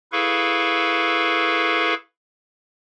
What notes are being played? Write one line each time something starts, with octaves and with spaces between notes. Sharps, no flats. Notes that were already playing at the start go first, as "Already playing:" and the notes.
E4 G#4 A4 B4 F5 C#6